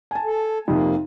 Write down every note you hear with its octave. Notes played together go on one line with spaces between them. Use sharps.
G#5 A5
A4
F2 C3 A#3 D#4